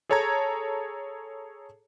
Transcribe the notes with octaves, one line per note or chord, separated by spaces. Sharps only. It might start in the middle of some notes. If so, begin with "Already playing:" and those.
G#4 A4 C#5 A5 A#5 G#6